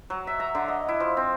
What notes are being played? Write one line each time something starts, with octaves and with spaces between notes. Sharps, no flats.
F#3
E5
A#5
D3
D#5
E4
F3
C4